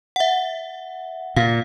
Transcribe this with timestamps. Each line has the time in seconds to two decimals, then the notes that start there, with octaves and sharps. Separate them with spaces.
0.16 E5 F#5
1.36 A#2 F5